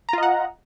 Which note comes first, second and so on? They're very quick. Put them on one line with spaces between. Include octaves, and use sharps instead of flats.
A#5 F4 D#5 F#5